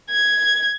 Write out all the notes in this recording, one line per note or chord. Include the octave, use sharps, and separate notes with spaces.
G#6